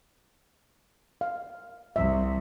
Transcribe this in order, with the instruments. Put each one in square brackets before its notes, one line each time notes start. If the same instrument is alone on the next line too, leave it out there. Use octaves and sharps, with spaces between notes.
[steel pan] F5
[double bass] C2 [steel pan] E5